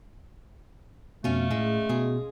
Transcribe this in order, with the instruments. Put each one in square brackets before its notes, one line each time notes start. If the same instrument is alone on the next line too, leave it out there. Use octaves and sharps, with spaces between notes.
[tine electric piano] F2 B2 [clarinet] A3 [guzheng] C#4 F4
[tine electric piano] A2 [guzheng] G#3
[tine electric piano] B2 [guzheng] G#4